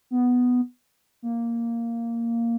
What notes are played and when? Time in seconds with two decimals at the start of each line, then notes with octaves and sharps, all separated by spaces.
0.11 B3
1.22 A#3